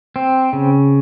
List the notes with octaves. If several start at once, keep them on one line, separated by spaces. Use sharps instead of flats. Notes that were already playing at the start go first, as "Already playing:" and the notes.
C4
C#3